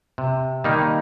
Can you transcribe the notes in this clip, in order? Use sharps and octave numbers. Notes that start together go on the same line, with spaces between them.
C3
D#3 G3 A#3 D#4